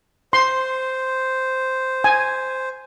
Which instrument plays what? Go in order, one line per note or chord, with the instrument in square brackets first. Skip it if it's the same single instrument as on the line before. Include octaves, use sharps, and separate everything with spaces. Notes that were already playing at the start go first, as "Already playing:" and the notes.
[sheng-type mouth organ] C5 [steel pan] C6
[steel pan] G#5